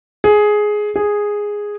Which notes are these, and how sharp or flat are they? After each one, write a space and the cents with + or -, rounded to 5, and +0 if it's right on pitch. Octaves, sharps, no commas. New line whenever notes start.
G#4 +10
G#4 -5